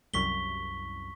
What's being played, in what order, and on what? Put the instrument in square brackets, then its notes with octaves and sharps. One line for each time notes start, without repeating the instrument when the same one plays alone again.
[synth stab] C2 F#2 [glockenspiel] C#6 B6 G7